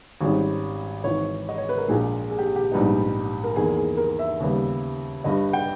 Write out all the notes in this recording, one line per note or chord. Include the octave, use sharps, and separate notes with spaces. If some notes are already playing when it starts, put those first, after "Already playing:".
G#1 G#2 G3 C#4
G#1 G#2 E3 C#5
D#5
C#5
B4
A#4
A#1 A#2 G#3 G#4
G#4
G4
G4
A#1 G#2 G3 B3 D#4
A#4
E2 D#3 A#3 G#4
G#4
A#4
E5
D#2 C#3 G3 B3
G1 G2 G3 D#5
G5